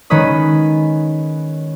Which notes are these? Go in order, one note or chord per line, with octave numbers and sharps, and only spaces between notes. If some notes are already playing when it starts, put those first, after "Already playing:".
D#3 G#3 C#4 B4 D#6